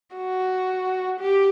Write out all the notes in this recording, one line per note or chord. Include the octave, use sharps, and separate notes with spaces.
F#4
G4